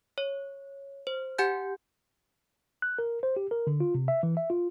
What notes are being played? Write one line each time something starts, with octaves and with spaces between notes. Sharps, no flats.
C#5
C5
G4 F#5 G#5 G6
F#6
A#4
C5
G4
A#4
D3
F4
C3
E5
E3
E5
F4